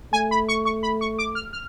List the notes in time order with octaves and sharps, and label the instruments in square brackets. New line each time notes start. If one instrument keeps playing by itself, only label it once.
[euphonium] A3 [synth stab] G#5
[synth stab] B5
C#6
C#6
B5
C#6
D6
F6
F6